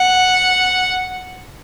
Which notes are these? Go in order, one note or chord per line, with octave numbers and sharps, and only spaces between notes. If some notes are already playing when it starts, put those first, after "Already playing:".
Already playing: F#5